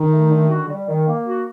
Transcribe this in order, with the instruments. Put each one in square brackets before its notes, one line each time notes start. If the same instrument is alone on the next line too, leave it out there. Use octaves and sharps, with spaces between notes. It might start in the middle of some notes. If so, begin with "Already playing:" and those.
Already playing: [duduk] D#3 [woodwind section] D#4
[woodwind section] A3
D3
F#4
G3
D#3
A#3
F#4